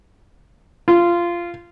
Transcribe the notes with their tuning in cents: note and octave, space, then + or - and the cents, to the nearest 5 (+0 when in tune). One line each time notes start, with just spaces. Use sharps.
F4 -15